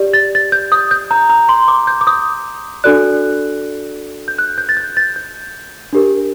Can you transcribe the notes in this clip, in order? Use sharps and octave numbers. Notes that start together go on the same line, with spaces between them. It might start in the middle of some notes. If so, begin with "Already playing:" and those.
Already playing: G4 D5
A6
A6
G6
D#6
G6
A#5
A#5
C6
D6
G6
D6
D#6
D4 F#4 A4 D5 F#6
G6
F#6
G6
A6
G6
A6
G6
D4 G4 A#4